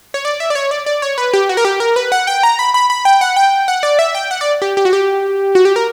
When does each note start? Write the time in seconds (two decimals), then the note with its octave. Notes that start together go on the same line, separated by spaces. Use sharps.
0.14 C#5
0.25 D5
0.40 E5
0.50 D5
0.55 C#5
0.71 D5
0.86 D5
1.02 C#5
1.18 B4
1.34 G4
1.49 F#4
1.57 A#4
1.65 G4
1.80 A#4
1.96 B4
2.12 F#5
2.27 G5
2.43 A#5
2.59 B5
2.74 B5
2.90 B5
3.05 G5
3.21 F#5
3.36 G5
3.68 F#5
3.83 D5
3.99 E5
4.15 G5
4.31 F#5
4.41 D5
4.62 G4
4.77 G4
4.85 F#4
4.93 G4
5.55 F#4
5.65 G4
5.76 A#4